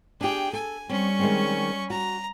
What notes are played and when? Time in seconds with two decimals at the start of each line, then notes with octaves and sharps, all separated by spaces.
0.21 D4 G4 G#4 G5
0.53 A4 G#5
0.89 G3 C4 C#4 C#6
1.19 D#3 G#3 C4
1.90 F#4 A#5